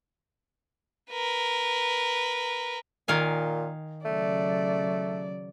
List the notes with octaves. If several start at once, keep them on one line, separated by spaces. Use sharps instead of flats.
A#4 B4
A#2 D#3 F5 G#5
C#3 F#3 A3 D5